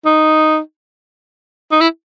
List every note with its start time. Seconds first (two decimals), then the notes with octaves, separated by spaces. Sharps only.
0.06 D#4
1.72 D#4
1.81 E4